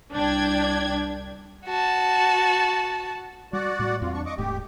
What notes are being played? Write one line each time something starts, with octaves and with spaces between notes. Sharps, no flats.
C2 D4 G5 G#6
F#4 A5
G3 F#4 D5 F#5
A2 G3
E2 G3 C4 F4
D4 C#6
D#5 C#6 D6
D#1 G#2 A3 G4